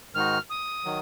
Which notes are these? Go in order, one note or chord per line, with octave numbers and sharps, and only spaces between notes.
G#2 D#3 G#3 D#4 F#4 F6
D#6
D#3 F#3